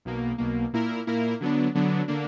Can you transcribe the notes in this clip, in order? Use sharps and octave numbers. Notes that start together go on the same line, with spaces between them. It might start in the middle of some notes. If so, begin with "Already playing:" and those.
B1 B2 A#3
B1 B2 A#3
A#2 A#3 E4 A#4
A#2 A#3 E4 A#4
D3 F#3 B3 D4
D3 F#3 B3 D4
D3 A#3 D4